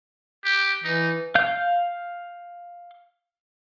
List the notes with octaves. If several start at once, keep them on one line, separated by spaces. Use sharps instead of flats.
G4
E3 D#4
F5 G6